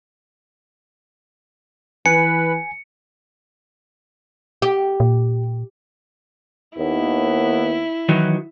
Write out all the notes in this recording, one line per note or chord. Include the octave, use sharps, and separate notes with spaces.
E3 B4 G#5 C#7
G4
A#2
D#2 B3 E4
D#3 E3 F#3